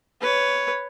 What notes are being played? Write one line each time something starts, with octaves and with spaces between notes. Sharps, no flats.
B4 C#5